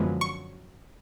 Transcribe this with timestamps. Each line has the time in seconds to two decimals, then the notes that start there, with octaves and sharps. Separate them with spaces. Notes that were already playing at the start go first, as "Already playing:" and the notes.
Already playing: F#2 D3 F3 G#3 B3
0.21 C#6